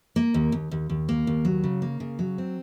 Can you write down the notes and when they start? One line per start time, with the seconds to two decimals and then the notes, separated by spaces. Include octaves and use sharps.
0.16 A#3
0.34 D#2
0.52 D#2
0.71 D#2
0.90 D#2
1.09 A#3
1.27 D#2
1.45 F#3
1.64 C#3
1.82 A#3
2.00 C#3
2.19 F#3
2.38 C4